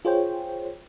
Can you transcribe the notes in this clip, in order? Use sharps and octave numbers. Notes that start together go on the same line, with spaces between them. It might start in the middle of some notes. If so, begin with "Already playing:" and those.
F4 G#4 C5 C#5 G5